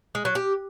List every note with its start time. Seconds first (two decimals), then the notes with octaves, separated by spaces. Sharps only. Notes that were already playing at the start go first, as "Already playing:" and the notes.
0.15 G#3
0.25 F#3
0.35 G4